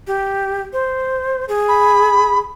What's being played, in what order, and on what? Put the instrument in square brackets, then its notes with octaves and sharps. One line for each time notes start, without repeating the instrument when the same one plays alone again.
[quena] G4
C5
G#4
[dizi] B5